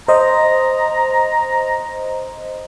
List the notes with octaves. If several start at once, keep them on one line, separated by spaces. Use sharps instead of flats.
C5 D#5 A#5